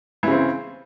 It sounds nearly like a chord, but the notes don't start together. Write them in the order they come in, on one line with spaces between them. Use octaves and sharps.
E3 C#3 C4